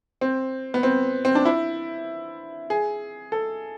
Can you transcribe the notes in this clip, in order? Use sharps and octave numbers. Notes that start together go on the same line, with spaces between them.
C4
B3
C4
C4
D4
E4
G#4
A4